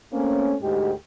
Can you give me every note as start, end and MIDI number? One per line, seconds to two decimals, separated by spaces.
0.14 0.55 57
0.14 0.55 58
0.14 0.55 60
0.14 0.55 61
0.62 0.91 38
0.62 0.91 44
0.62 0.91 56
0.62 0.91 67